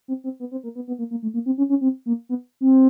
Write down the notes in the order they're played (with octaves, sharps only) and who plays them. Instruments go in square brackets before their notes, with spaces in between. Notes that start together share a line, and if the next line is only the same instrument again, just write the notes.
[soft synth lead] C4
C4
B3
C4
A#3
B3
B3
A#3
A#3
A3
A#3
C4
C#4
C#4
C4
A#3
B3
C4